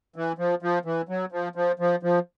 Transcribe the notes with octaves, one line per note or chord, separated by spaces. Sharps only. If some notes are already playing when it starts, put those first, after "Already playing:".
E3
F3
F3
E3
F#3
F3
F3
F3
F3